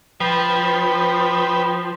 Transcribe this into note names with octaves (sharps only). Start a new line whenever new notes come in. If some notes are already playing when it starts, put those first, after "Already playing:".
F3 B4 G5